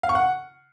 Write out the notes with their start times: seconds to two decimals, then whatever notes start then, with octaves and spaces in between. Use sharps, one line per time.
0.03 F5
0.09 C#6
0.15 F#5